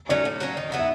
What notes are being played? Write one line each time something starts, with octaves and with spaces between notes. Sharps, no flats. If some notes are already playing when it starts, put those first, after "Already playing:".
F#3 A3 C#4 D5
A2
F#3 A#3 C#4
D#3
F#3 B3 E4
E5